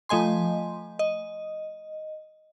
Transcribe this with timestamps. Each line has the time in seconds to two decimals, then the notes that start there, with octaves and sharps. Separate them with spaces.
0.09 F3 A3 D#5 G#5 C6
0.99 D#5